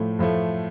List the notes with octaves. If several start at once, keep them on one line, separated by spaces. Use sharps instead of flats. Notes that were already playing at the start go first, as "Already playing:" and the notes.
Already playing: A2 F3 A3
A2 F3 A3